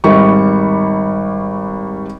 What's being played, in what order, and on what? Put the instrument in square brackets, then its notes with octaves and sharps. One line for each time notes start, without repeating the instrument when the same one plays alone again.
[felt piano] G#1 G3 C#6